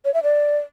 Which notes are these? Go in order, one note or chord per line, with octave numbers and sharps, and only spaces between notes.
C#5
E5
D5